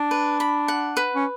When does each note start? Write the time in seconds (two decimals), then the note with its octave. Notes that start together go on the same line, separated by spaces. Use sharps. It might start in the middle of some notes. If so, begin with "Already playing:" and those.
Already playing: D4
0.11 B4
0.40 B5
0.68 F#5
0.97 B4
1.15 C#4